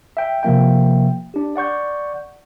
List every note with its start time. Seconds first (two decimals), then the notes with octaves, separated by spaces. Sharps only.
0.17 E5 G5
0.43 C3 F3 A#3 E5 G5
1.34 D4 G4
1.56 D5 F#5 C#6 G6